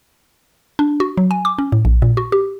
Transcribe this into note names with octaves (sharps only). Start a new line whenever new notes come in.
D4
F#4
F#3
G#5
D6
C#4
A2
A#1
A#2
F#4
G4